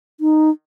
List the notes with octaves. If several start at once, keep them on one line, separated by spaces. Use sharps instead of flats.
D#4